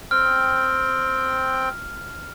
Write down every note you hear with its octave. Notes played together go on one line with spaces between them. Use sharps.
C4 G5 F6